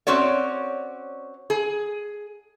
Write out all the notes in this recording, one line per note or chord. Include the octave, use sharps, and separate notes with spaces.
C4 C#4 F#4 C#5 D5
G#4